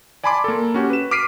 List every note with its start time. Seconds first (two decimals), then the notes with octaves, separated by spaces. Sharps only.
0.24 D5 G#5 A5 B5 C6 D6
0.44 A#3 A4
0.74 C#4 F#4 G4
0.90 B4 E7
1.11 D6 F6 B6 C7 D7 D#7